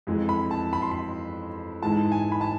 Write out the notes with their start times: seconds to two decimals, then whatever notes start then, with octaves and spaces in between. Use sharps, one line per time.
0.07 F2 E3 G#3
0.29 B5
0.51 A5
0.73 B5
0.82 C6
0.91 B5
1.82 G#2 E3 G#3 A5
2.12 G#5
2.32 B5
2.41 A5